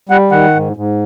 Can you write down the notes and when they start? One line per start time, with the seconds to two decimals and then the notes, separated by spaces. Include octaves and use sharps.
0.09 G3 F#5
0.31 D#3 F#5
0.55 G#2
0.77 G#2